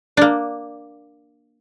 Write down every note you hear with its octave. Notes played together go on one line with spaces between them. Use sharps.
A#3 D4